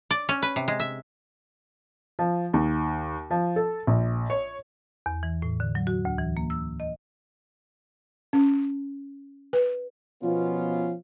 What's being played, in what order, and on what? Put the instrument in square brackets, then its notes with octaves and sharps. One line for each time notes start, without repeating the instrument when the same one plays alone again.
[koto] D5
C#4
B4
C3
G#3
E5
[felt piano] F3
D#2
F3
A4
A#1
C#5
[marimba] E2
E3
A2
D3
F#3
F#4
D2
E3
A#3
E6
D#5
[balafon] C#4
B4
[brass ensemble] B2 F3 B3 C#4 F4